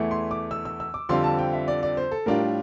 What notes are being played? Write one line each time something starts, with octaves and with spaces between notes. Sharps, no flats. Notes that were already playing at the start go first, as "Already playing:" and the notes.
Already playing: E2 E3 A3 E4
C6
D6
E6
E6
E6
D6
F2 D3 G3 C4 F4 C6
A5
G5
E5
D5
D5
C5
A4
A2 G3 D4 F4 A#4